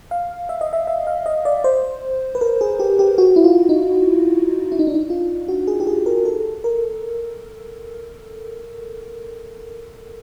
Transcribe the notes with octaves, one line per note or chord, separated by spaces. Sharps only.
F5
E5
D#5
E5
E5
F5
D#5
D5
C5
B4
A#4
G#4
G4
G4
F#4
E4
F4
D#4
E4
D#4
D4
D#4
F4
F#4
G#4
G4
G#4
A#4
A4
A#4